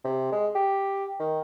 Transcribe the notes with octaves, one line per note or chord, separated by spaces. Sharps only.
C3
G#3
G4
D#3